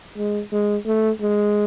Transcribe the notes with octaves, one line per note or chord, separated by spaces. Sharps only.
G#3
G#3
A3
G#3